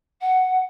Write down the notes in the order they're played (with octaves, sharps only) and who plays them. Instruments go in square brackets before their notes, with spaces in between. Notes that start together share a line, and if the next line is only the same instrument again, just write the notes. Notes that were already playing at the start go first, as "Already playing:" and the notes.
[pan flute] F#5